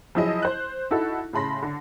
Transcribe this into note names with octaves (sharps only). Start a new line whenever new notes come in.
F3 F#3 E4 G#4 D#5
C5 F#6
D#4 E4 F#4 A4
A2 C#3 A5 B5 C6 A#6
D3